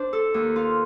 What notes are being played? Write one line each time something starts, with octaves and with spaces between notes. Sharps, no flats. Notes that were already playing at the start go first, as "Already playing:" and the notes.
Already playing: D4 C5
A4
D#2
F4